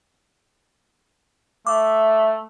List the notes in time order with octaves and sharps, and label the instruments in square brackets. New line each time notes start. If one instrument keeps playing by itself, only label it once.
[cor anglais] A3 [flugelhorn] E5 [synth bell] D6